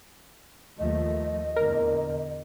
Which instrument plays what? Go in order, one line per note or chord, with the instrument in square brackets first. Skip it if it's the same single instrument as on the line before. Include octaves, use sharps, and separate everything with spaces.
[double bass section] D#2 F3 A3 [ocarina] D#5
[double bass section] E2 A#2 D3 [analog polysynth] A#4